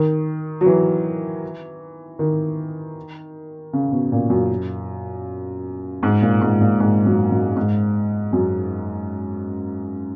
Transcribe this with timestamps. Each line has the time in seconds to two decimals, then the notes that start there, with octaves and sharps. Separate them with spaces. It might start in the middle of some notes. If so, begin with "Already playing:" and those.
Already playing: D#3
0.61 F#3
0.66 E3
2.19 D#3
3.73 C#3
3.92 B2
4.12 A#2
4.30 F#2
6.03 G#2
6.22 A#2
6.42 G#2
6.61 A#2
6.80 G#2
7.06 F#2
7.31 F#2
7.56 G#2
8.33 F#2